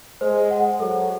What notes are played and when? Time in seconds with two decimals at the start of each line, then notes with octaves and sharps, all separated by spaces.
0.21 G#3 C5
0.51 F#5
0.80 F#3 A4